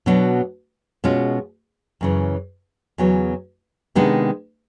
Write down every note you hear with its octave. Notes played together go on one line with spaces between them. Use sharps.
B2 F#3 B3 D4
B2 G#3 C#4 F4
F#2 C#3 E3
E2 C#3 F#3 B3
C3 D#3 G#3 B3 D4